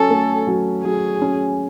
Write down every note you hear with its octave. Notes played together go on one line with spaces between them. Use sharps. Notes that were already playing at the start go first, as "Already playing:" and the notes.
Already playing: F#3 C#4 A4
A3
F#3
F#3 G#4
C#4